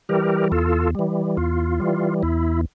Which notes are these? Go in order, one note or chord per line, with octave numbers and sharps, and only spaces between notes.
E3 G3 G4 A#4
E2 F4 A4
E3 G3
E2 F4
E3 G3
E2 E4